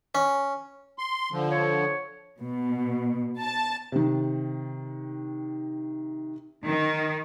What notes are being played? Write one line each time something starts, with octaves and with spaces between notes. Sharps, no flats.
C#4
C6
D3 F3
C#5
B2
A5
C3 D#3
D#3